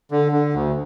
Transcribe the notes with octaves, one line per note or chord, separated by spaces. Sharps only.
D3
D3
D2